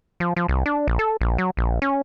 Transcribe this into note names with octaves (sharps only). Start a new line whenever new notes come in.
F3
F3
C2
D4
A#1
A4
A#1
F#3
A#1
C#4